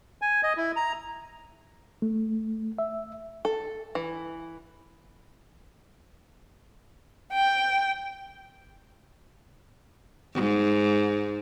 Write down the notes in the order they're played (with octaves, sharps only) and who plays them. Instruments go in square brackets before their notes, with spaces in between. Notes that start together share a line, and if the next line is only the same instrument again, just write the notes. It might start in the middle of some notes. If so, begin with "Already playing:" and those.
[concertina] G#5
D#5
E4
A#5
[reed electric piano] A3
E5
[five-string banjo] A4
E3
[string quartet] G5
[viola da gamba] G#2